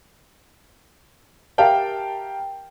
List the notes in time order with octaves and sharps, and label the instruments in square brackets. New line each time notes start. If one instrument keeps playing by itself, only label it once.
[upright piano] G4 A#4 E5 F5 G5 A5